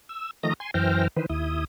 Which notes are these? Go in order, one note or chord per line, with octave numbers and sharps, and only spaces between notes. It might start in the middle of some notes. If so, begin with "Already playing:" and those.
E6
D#3 F3 A3 D#5 A#5 A#6
G#5 C6
F#2 E3 C5 G5 F6 A#6
D#3 E3 B4 C5
D#2 E4 D#6